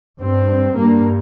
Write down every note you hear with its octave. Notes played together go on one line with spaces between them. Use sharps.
G2 C4
G2 A#3